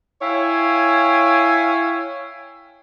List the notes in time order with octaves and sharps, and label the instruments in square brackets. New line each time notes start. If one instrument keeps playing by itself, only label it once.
[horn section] E4 C#5 F5 G5 G#5